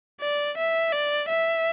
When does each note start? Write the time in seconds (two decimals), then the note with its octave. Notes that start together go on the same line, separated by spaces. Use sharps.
0.21 D5
0.57 E5
0.92 D5
1.29 E5